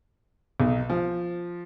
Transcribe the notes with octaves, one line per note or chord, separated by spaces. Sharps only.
B1
F3